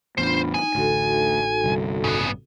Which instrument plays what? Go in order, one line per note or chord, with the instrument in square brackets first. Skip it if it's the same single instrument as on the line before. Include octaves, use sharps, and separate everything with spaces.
[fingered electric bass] A1 E2 [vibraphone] D4 F4 B5 [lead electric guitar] C5
[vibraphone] D#4 [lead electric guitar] G#5
[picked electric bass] A1 [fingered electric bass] D2 [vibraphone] D#4 F#4 A4
[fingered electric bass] G1 C2
[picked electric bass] A1 G2 [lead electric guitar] C#3 B3